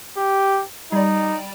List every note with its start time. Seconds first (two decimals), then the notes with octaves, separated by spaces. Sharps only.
0.17 G4
0.92 G3 D#4 D5